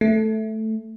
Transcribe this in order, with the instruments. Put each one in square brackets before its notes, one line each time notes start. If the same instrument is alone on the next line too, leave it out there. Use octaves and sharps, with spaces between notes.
[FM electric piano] A3